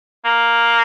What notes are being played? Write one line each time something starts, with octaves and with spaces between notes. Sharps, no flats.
A#3